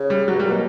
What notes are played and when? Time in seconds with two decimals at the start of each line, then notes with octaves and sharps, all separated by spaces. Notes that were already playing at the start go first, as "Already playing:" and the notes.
Already playing: C#3
0.10 G3
0.28 F#3
0.34 G2
0.39 G3
0.44 A#2
0.51 B2 A#3